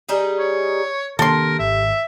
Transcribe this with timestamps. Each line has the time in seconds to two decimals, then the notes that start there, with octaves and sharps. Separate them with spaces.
0.09 G3 D#4 G#4
0.39 C#5
1.19 C3 D#3 A#3 D4 A4 A#4 C6
1.59 G#1 E5